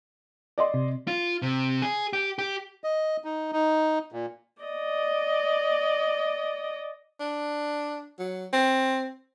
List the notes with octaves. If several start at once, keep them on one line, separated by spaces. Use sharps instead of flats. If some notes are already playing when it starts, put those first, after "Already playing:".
D5 D#5 C6
C3
F4
C3
G#4
G4
G4
D#5
D#4
D#4
A#2
D5 D#5
D4
F#3
C4